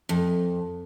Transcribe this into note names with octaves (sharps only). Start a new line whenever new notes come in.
F2